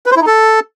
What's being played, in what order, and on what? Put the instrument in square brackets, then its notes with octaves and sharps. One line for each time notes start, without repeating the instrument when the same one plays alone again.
[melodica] B4
C5
E4
D#4
A4